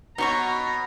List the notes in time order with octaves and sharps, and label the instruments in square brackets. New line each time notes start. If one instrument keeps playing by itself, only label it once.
[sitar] B2 [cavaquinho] D#4 C#5 C#6 [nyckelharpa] A#5